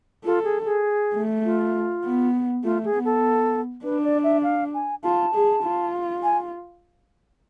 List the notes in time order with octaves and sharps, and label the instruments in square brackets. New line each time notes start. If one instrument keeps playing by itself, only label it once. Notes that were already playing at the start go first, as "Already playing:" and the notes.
[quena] F4 [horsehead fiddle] A4
[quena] G#4
G#4
[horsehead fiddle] A3
[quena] F4
[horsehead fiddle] B3
[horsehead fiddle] A3 [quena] F4
[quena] G#4
[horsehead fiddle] B3
[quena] A4
[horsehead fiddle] D4 [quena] B4
[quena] D5
E5
F5
G#5
[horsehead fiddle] F4 [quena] A5
[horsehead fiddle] G#4
F4
[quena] G#5